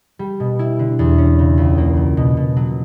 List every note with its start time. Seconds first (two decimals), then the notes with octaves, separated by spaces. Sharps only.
0.19 G3
0.40 B2
0.59 E4
0.79 D3
0.99 E2
1.18 C#4
1.39 C#3
1.58 C#2
1.78 A#3
1.97 F#3
2.17 B2
2.37 B2
2.57 F#3